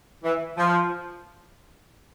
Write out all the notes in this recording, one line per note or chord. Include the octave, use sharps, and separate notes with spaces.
E3
F3